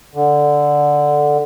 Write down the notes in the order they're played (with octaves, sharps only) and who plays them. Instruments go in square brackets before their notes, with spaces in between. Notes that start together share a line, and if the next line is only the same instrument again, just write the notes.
[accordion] D3